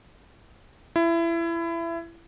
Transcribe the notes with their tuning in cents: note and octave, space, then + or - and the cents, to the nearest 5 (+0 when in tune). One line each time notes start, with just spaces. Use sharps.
E4 +25